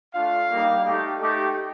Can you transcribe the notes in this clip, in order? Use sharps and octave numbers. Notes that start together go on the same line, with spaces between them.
A3 D4 F4 F5
G3 A#3 D#4 G4
A3 D#4 G4
A3 D#4 G4